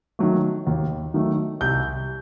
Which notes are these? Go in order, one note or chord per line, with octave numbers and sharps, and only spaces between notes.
D#3 F#3 A3
D#2
D#3 F#3 A3
C2 G6